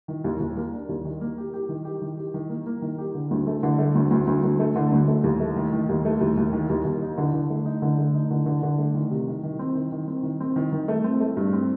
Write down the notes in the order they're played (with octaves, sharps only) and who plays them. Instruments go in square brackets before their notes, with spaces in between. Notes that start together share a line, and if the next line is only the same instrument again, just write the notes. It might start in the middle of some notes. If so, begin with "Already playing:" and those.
[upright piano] D#3
D#2
D#2
A#3
D4
D#2
D#3
A#3
G4
G4
D#3
G4
D#3
G4
D#3
A#3
A#3
D#3
G4
D3
D2
A3
D3
A3
D2
D2
D2
D2
A3
D3
D2
A3
D#2
A3
D#3
D#3
D#2
A3
D#2
D#2
D#3
D#2
D#2
D#4
D3
D3
A3
D#4
D3
A3
D#4
D3
D3
D3
A3
D#3
C3
D#3
D#3
C4
D#3
D#3
C4
D#3
C4
D#3
D#3
A3
C4
A3
G2
C4